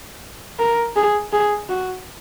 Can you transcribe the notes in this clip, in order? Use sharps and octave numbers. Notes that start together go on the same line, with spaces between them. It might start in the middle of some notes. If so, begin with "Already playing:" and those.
A#4
G#4
G#4
F#4